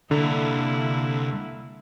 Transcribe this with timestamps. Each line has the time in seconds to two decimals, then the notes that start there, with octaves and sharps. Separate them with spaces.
0.11 C2 D3 A#3 E4 A#5